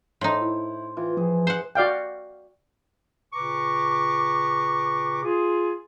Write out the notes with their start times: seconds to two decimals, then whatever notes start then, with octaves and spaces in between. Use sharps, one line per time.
0.21 A2 D#4 C5
0.41 E4
0.97 E3 F4
1.17 F3 G#4
1.47 C5 F#5
1.75 F#4 D5 F5 G5
3.34 A#2 C#3 B4 A#5 C#6 D6
5.23 F4 G#4